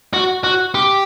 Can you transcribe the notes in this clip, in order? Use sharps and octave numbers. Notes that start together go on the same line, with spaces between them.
F#4
F#4
G4